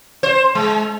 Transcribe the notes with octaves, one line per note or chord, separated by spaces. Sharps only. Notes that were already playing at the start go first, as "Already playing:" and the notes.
C5
G#3